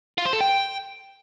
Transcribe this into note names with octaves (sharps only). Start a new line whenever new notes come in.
F4
C5
A4
G5